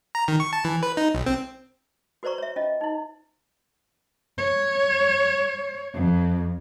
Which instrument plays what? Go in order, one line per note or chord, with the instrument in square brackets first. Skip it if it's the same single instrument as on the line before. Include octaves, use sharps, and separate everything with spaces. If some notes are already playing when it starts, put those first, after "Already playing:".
[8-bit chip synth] A#5
D#3
C#6
A5
E3
B4
D#4
B1
C4
[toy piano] F#4 B4 C5 D5 A#5 C#6
C#5 E5
C#4 F4 D#5
D#4 E4
[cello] C#5
F2